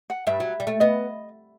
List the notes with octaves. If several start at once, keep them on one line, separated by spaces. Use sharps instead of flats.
F#5
G2 E5
F#3
G3
A3
B3 D#5